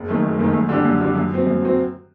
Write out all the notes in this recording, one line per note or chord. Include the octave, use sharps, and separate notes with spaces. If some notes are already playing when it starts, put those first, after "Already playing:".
Already playing: F#1
F#2 D#3 A3
F#1
F#2 D#3 A3
F#2
D3 G3 D4 G4
F#2
D3 G3 D4 G4
F#2
F#3 C4
F#2
F#3 C4